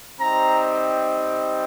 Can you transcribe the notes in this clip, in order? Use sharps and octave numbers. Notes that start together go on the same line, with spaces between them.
G3 C4 D#4 A#5